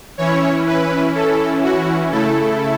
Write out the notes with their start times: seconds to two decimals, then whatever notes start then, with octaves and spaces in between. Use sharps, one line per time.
0.18 E3 C#4 E4 C#5
0.67 B4
1.15 A4
1.63 F#4
2.11 C#3 A3 E4 A4